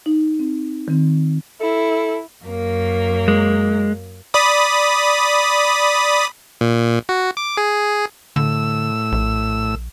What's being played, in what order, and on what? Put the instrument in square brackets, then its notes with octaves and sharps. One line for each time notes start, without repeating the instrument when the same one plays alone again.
[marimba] D#4
C4
D#3 C4
[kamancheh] E4 [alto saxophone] A4
[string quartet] F#2 A#3
[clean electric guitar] G#3
[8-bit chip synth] D5 B5 D#6
A#2
F#4
D6
G#4
[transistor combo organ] A2 E6 [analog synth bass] D3
[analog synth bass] A#1